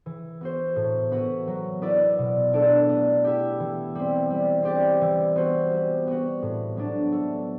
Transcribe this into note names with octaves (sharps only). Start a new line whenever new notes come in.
E3
B3 F#4 C5
A2
E3 B3 F#4 B4
F#3
B3 E4 B4 D5
B2
A3 D4 A4 D5
B3
E4 G4
E3
G3 C4
G3
C4 G4 D5
E3
B3 F#4 C5
G3
B3 F#4
A2
F#3 B3 D4
A3